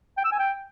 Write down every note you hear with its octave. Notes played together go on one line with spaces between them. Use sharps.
G5
E6
G#5
G5